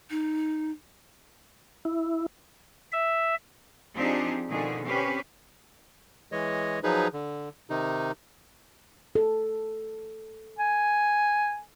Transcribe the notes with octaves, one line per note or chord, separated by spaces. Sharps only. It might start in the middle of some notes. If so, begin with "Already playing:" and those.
D#4
E4
E5
F3 C4 D4 D#4 G4 G#4
B2 D3 D#3 F3 G#4
C4 C#4 G4 B4
E3 G#3 C#5 D#5
F3 F#3 D#4 G#4 B4
D3
C3 D#3 D#4
A4
G#5